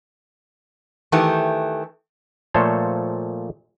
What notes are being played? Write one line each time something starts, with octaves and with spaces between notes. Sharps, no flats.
D#3 E3 A3 G4
A#2 F3 A3 A4 C5 C#5